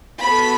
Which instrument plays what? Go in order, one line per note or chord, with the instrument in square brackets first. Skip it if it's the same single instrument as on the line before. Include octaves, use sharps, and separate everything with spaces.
[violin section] B3 F#4 A4 B5